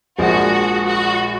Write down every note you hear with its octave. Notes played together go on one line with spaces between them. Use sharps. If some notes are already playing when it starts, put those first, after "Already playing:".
A#1 A#2 F3 G#3 F#4
F#4